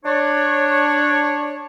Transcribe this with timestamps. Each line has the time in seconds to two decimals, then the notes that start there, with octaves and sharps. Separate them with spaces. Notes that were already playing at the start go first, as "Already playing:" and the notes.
0.05 D4 C#5